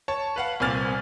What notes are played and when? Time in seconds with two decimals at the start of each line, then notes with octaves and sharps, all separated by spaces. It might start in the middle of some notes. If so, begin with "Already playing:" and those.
0.08 C#5 A5
0.36 B4 F5 F#5
0.60 C2 A#2 C4 G#5 F6 A6